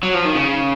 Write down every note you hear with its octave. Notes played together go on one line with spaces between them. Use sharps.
F#3
F3
D#3
C#3